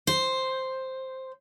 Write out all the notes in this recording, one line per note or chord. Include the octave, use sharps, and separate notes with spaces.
C5